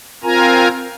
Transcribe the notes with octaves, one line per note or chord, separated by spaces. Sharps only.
C4 F4 A#4 G#5 A#5